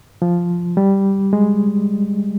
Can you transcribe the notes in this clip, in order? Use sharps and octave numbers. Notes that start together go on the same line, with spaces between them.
F3
G3
G#3